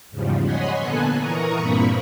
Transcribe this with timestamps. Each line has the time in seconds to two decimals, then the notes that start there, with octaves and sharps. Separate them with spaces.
0.10 E2 G#2 C#3 F3 G3
0.43 C#5 D#5 F#5 G#5 B5 C6
0.76 A#2 D3 B3 A4 G#5 F#6
1.15 E3 A#4 A#5 C#6 D#6
1.58 G2 A#2 A#3 C4 B5 C#6